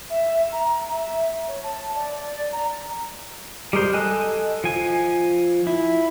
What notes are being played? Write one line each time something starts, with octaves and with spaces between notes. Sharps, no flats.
E5
A#5
E5
C#5
A5
D5
A#5
G3 G#3 A#4 C5
A4 D#5 G#5 F#6
F3 G#5
E4